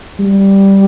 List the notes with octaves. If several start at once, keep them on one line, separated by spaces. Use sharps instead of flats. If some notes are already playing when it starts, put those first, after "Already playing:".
G3